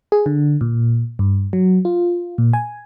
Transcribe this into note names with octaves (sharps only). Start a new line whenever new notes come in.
G#4
D3
A#2
G2
F#3
F4
A#2
G#5